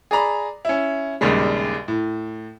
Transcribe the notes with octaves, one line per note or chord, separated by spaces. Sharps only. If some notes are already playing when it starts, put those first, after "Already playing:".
G#4 D5 A#5 B5
C#4 E4
A#1 D#2 C#3 G3 G#3
A2